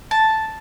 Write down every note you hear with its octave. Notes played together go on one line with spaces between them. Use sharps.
A5